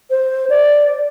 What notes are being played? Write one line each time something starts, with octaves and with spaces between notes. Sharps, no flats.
C5
D5